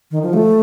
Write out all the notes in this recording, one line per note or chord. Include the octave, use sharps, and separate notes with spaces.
D#3
F3
A3